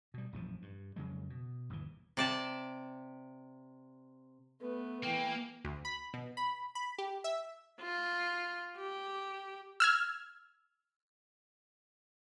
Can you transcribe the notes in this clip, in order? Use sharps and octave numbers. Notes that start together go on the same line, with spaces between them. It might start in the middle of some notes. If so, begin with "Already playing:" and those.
B2 G3
A#1 F#2 E3 F3
G2
F2 C#3 F#3 G#3
B2
G1 D#2 D3 E3
C3 D5 A5
A3 B3 B4
E3 A#3 G5
D2
B5
B2
B5
B5
G4
E5
F4
G4
E6 F6 G#6